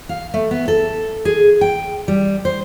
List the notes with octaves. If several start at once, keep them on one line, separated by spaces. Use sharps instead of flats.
F5
A3
B3
A4
G#4
G5
G3
C5